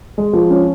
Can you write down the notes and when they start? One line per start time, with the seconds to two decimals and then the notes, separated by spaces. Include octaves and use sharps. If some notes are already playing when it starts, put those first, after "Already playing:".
0.18 G#3
0.33 F3
0.50 C#4